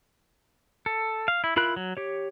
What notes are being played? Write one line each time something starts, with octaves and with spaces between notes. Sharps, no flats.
A4
F5
E4
E4 F4 A#4 B5 F#6
F#3
G4 C#5